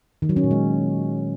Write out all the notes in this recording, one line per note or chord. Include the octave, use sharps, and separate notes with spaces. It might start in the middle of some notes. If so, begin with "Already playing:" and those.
D#3
F#3
C#4
A#2
G#3